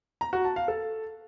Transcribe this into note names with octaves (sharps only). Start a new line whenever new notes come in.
A#5
F#4
A5
F5
A4